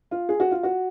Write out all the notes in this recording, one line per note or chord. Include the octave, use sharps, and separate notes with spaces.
F4
G#4
F#4
F4
F#4